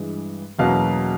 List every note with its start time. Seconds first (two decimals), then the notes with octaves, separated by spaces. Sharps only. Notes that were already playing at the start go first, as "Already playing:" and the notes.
Already playing: G2 E3 G#3
0.59 E2 B2 F#3 A#3 C#4 F5